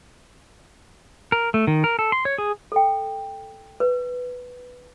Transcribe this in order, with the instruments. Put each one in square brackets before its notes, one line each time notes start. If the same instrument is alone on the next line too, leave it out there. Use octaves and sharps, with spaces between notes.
[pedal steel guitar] A#4
A3
D#3
A#4
A4
C6
C#5
G#4
[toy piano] A4 G5
B4